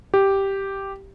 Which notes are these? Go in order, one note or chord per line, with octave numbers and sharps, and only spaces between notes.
G4